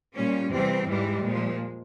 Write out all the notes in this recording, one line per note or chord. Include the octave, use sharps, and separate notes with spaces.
A#2 G3 C#4
E2 C3 E3 G3 C4
G#2 E3 G3 G#3
A#2 F3